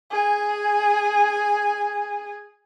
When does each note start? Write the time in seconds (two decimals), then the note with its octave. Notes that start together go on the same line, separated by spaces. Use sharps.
0.11 G#4 G#5